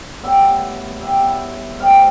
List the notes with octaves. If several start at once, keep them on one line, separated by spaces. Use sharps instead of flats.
A2 G3 B3 E4 E5
A2 G3 B3 E4 E5
A2 G3 C4 F5